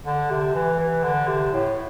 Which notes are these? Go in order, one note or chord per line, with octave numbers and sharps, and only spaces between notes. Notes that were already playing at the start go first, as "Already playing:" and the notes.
D3
C3
E3
E3
D3
C3
A2